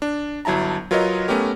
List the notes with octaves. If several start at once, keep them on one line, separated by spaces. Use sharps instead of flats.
D4
G1 F#3 E4 A5 A#5
F#3 F4 A#4 B4 C#5 D#5
A3 B3 C#4 G4 A#4